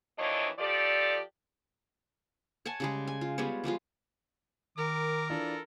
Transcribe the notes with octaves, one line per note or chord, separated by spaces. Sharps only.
D#2 E3 F3 D4 C#5 D#5
F3 G4 A4 D5
C#5 F#5 G#5 A5
C#3 G3 G#3
G#5
F4
G3 G#3 B3 C#5
F3 G3 G#3 F4
D#3 A#4 D6
E3 D4 F4 A4